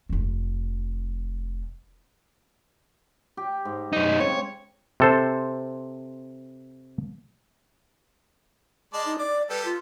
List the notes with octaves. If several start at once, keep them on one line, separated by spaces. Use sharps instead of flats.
F1 C4
G4
G#2
F#2 D#4
C#3 C4 C#5
C3 A4 C5
G#3 D5 D#5 A5
D#4
D5 D6
G3 G4 A4 B4
F4